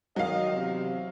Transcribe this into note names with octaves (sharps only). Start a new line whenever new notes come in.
D#3 F#3 D#5 F5
E2 C3